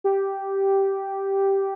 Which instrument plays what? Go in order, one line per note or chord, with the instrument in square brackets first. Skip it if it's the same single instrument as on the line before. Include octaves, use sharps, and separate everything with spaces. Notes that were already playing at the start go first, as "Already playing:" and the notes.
[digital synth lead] G4